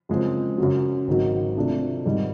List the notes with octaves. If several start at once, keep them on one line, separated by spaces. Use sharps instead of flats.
F#2 C#3 F3 G#3 C4
F#2 C#3 F#3
G#1 G#2 D#3 F#3
C3 F3 A3 D4
G#1 G#2 D#3 G3